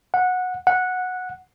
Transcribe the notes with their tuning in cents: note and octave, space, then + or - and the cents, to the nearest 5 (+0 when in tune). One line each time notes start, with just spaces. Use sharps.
F#5 -15
F#5 -10